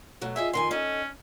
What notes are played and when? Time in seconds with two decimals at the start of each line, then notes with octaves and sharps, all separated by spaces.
0.21 B2 F#3 A3
0.36 F4 G#4 D#5 E5
0.53 F2 D#3 G#5 C6
0.71 C#4 D#4 A4